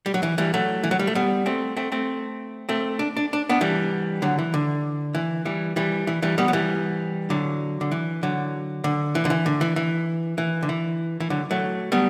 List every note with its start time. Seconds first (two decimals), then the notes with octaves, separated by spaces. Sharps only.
0.06 G3
0.14 F#3
0.23 E3
0.38 E3 G3
0.54 F#3 A3
0.84 E3
0.91 F#3
0.99 G3
1.07 A3
1.15 G3 B3
1.46 A3 C4
1.77 A3 C4
1.92 A3 C4
2.69 A3 C4
2.99 D4
3.17 D4
3.33 D4
3.49 B3 D4
3.61 E3 G3
4.22 D3 F#3
4.39 E3
4.54 D3
5.15 E3
5.45 E3 G3
5.76 E3 G3
6.07 E3
6.22 E3 G3
6.38 G3 B3
6.48 F#3
6.53 E3 G3
7.30 D3 F#3
7.81 D3
7.91 E3
8.23 D3 F#3
8.84 D3
9.15 E3
9.25 D3
9.30 E3
9.46 D3
9.61 E3
9.76 E3
10.38 E3
10.63 D3
10.69 E3
11.20 E3
11.30 D3 F#3
11.51 F#3 A3
11.92 G3 B3